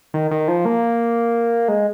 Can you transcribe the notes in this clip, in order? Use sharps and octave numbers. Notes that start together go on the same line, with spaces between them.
D#3
D#3
F3
A#3
G#3